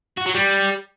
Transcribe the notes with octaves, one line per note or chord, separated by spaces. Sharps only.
F#4
F#3
G3